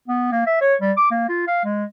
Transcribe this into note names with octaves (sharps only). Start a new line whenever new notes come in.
B3
A#3
E5
C#5
G3
D6
A#3
F4
F5
G#3